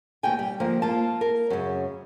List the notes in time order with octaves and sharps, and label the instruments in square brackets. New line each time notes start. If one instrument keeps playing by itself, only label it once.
[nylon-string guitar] D#2 B2 G5 G#5
G3
D3 F3 A#3
A#3 F4 A5
A#4
F#2 C#3